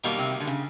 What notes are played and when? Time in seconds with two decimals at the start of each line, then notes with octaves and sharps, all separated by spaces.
0.04 B2 D#3 G3 A#3 D#4 F#4
0.19 C3
0.40 D3
0.47 C#3